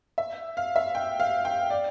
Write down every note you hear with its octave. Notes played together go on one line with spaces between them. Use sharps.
E5
F5
E5
G5
F5
G5
D5